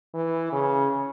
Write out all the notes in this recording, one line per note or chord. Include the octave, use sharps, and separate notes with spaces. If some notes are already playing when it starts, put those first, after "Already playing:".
E3
C#3